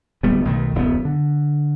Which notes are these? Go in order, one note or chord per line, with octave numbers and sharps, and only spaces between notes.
D1 G3 A3 B3
B1 D#3 G3 A3
D1 F#2 G#3 B3
D3